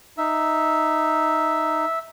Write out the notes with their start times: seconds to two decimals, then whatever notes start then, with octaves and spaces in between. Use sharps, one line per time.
0.18 D#4 E5